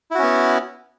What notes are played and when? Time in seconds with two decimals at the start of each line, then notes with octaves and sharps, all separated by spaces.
0.11 E4
0.15 F#4
0.19 C#4
0.23 B3